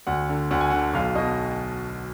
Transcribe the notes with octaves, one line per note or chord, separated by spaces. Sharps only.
D2 F#5
D3
D2 F#5
G#5
D3 F#5
B1 F5
B2 D#5